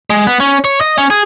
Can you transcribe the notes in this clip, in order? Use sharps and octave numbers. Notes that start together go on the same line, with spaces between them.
G#3
B3
C#4
C#5
D#5
C#4
G#4